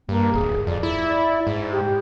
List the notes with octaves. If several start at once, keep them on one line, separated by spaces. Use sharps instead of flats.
G2 A#3
D1 G#4
F2 D5
E4
G#2
G4